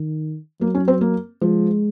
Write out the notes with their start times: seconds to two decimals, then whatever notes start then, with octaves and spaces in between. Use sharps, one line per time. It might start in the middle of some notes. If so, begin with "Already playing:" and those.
Already playing: D#3
0.61 F#3 A#3
0.75 C#4
0.88 C4
1.01 A#3
1.41 F3 G#3